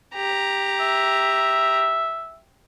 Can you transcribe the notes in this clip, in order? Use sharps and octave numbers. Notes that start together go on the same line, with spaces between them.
G4 A#5
E5